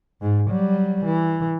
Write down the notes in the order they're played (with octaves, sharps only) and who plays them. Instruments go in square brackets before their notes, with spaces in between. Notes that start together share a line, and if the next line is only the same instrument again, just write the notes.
[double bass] G#2
F#3 G3
E3